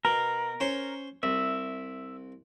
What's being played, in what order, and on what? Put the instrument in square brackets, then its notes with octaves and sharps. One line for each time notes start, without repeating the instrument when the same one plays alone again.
[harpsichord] B2 [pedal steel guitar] A#4
[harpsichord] C#4 C5 C#5
[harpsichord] C2 [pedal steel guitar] E5